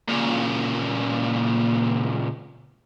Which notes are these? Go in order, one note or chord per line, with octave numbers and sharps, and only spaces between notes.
A#2 C#3